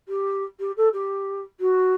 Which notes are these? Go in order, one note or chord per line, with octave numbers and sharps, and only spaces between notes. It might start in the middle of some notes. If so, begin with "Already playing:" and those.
G4
G4
A4
G4
F#4